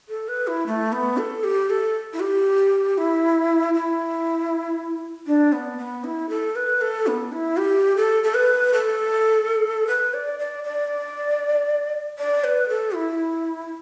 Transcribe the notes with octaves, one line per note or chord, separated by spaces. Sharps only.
A4
B4
E4
A3
B3
A4
G4
A4
E4
G4
E4
E4
D4
B3
B3
E4
A4
B4
A4
B3
E4
G4
A4
A4
B4
A4
B4
D5
D5
D5
D5
B4
A4
E4